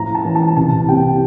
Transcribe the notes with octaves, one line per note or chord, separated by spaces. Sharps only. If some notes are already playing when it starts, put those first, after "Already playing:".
Already playing: A2 F3 A#5
A5
E3
A5
C2 A5
C3 G5